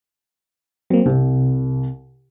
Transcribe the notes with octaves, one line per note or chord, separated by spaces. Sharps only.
F#3 A#3 C4
C2 C3